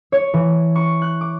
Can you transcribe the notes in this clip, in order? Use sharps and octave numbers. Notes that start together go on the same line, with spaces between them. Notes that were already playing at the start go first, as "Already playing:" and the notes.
C#5
E3
C#6
F#6
D6